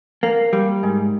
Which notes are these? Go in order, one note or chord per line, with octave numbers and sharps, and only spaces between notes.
A#3
G3
G#2